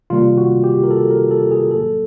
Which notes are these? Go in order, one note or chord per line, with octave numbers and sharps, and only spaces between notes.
C3 D#3 G3 A#3 F4
F#4
G4
A#4
A4
A#4
A4
G#4
A2 F#3 A#3 A4